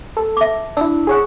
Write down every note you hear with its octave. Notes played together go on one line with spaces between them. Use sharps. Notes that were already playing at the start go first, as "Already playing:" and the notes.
A4
E5 D6
D4 E4 E6
G#4 C#5 F#5